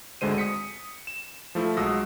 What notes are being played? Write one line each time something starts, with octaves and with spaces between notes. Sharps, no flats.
G#1 D2 D3 G#3 C5 D#7
D#6 B6 C#7
E7
F3 A3 E4 F4
B1 G#3 F#4 D#6 E6 A#6